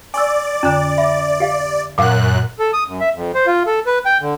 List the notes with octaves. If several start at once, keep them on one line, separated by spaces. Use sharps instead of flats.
D5 G#5 C#6 E6
F2 D3 C#4 A#5
E5 B5
G4 F5
F#2 A#2 A#4 F5 F#5 F#6
A4
D#6
F#2
E5
F2
C5
F4
A4
B4
G5
D3